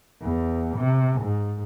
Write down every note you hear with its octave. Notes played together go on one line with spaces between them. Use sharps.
E2
C3
G#2